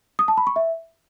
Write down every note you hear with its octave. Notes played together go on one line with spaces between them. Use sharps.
D#6
A5
B5
C#6
E5